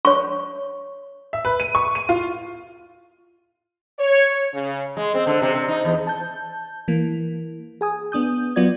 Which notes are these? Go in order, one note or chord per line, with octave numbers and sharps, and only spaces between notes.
C#5 C#6
E5
B4
D#7
C#6
D#7
F4
C#5
C#3
G#3
C4
D3
C3
C3
D#4
E2
A5 G6
E3 A#3
G#4 G#5 D#6
B3 D4 D#6 G6
F#3 B3 F4 D5 G#6